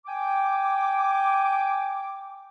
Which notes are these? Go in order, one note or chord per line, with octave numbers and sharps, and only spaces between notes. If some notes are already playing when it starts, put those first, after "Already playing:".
G5 G#5 D6